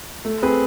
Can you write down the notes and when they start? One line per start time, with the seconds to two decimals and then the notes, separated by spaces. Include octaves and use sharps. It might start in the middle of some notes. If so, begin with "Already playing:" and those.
0.25 A3
0.42 C4 G#4 B4